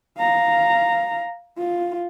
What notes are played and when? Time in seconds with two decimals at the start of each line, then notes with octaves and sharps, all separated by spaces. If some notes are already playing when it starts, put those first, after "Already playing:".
0.18 F5 A#5
1.58 F4